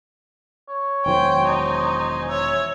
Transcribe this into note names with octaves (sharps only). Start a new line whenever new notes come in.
C#5
E1 D#3 F#3 C5 G5 G#5
D#4
C#5 E5